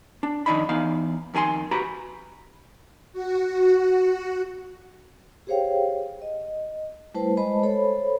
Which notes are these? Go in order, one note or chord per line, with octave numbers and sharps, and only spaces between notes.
D4
F2 D#3 D4 D#4 B5
E2 D#4 F5
F2 D#3 G#4 G#5 C6
F#4 G4 B4 A#5 B5
F#4
G4 G#4 C5 C#5 F5 G5
D#5
G3 A3 E4 B4 C5 A5
G#3 C5 D#5 A5 B5
A4 C5 C#5 B5